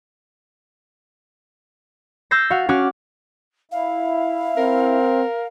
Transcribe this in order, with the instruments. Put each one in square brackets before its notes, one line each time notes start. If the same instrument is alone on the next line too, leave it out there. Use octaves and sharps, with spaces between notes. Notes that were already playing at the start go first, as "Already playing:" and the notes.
[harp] E6 G6 A6 A#6 C7
F#4 F5
C#4 F#4 D6 F6
[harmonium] E4 [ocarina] F5
[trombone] C4 [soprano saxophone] A#4